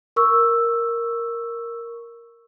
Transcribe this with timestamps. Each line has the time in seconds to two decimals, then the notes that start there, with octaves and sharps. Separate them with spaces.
0.16 A#4 C#6 E6